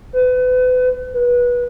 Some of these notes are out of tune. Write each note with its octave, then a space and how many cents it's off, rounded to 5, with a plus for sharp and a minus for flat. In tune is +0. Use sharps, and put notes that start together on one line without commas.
B4 +35
B4 -20